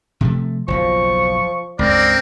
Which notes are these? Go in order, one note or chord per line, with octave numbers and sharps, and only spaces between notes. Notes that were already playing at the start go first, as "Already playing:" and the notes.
C3 F3 A3
F#1 B1 B2 F3 C#6
C#2 G2 C4 A#4 D5